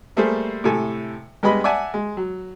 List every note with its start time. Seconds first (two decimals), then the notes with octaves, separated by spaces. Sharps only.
0.17 G3 A3 A#3 G#4 A4 C5
0.64 A2 C3 A4 G#5
1.43 G2 G#3 B3 G4 D#5 B5
1.64 D5 E5 F#5 G#5 A5
1.94 G#3
2.17 F#3